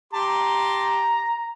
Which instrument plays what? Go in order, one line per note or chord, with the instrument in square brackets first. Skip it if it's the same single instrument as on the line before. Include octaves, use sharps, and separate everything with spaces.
[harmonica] G4 A5 C6 [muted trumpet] A#5